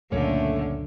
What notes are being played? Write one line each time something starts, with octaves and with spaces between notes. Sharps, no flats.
C#2 F#2 A#2 D3 A3 A#3 C#4 C#5